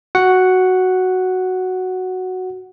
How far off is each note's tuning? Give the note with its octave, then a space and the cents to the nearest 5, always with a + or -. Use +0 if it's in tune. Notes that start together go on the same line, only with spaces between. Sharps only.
F#4 +0 F#5 +0